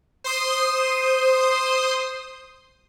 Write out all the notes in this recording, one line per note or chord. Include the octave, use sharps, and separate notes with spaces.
C5 C6 D#6